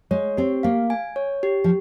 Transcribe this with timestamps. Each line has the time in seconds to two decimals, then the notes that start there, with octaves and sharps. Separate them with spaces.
0.11 G#3 C#5
0.37 C4 G4
0.63 A#3 F5
0.90 G#5
1.16 C#5
1.43 G4
1.64 F3